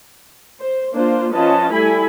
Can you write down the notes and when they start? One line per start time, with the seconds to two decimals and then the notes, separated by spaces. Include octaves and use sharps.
0.59 C5
0.92 A#3 D4 F4 C5
1.33 F3 C#4 F4 B4 D#5 A5
1.72 G3 A3 E4 A4 G#5 B5